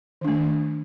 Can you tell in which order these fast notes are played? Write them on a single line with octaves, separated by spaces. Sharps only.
D#3 D4 A3